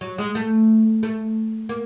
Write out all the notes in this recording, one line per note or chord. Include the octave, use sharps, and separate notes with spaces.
F#3
G#3
A3
A3
A#3